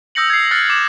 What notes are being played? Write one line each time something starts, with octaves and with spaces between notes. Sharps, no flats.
D#6 E6 G6 A#6 C#7 F#7
G#6 C7
F6 F#6 A6 A#6 C#7
D6 E7 F#7